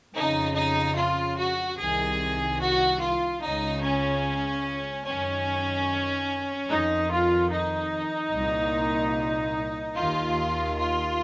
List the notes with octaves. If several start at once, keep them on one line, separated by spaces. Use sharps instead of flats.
F2 C#3 D#4
D#4
F4
F#4
C2 C3 D#3 G#4
F#4
F4
C#2 C#3 D#4
C#4
F#2 D#3 C#4
F2 D#3 D#4
F4
D#4
C2 A#2
D#2 D#3 F4
F4